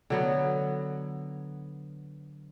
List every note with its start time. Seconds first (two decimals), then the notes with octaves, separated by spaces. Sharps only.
0.10 D3 F#3 B3